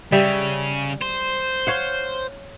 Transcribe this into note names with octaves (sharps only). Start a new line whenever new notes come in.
C#3 G3 E5
C5
C#5 F5 F#5